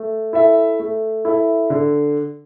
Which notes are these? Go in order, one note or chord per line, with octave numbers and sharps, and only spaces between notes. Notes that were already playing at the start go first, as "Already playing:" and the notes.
Already playing: A3
E4 A4 E5
A3
E4 A4 E5
D3